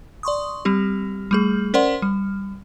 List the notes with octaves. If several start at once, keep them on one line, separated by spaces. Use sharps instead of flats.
D5 C6 C#6 D#6
G3 C4 G4
G3 A3 G#4
C#4 A#4 C5 D5 F#5 C6
G3